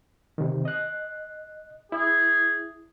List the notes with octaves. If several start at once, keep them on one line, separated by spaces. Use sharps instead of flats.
C3 D#3
D#5 F#6
E4 G#4